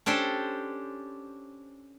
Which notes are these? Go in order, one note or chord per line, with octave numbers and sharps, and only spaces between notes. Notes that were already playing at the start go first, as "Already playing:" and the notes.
C#4 D4 G4 A4 C5